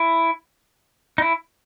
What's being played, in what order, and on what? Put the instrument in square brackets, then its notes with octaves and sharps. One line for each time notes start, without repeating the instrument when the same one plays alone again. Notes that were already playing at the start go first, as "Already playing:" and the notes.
Already playing: [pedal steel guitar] E4
D#4
E4